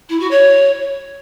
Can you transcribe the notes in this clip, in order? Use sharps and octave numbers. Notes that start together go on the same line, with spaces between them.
E4
F#4
C#5